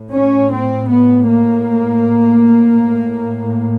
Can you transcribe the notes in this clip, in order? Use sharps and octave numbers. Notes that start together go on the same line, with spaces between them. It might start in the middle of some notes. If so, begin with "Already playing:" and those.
Already playing: A2
C#4
C4
B3
A#3
A2